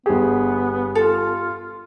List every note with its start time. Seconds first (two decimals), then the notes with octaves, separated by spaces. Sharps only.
0.06 G1 B3 G4 G#4
0.95 F4 A4